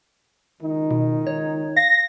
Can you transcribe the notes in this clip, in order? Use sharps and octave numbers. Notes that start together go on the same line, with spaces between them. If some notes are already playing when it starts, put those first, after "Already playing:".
C#2 D#3 D#4
B2
C#5
F5 A#6